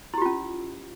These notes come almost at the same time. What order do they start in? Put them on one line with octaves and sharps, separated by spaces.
E4 G4 F4 C#4